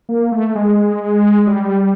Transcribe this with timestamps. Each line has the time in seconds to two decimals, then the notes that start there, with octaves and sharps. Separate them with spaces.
0.09 A#3
0.32 A3
0.55 G#3
1.47 G3